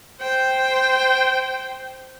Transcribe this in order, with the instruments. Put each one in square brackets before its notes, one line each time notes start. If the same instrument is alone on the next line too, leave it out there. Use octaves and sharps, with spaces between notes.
[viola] C5 G5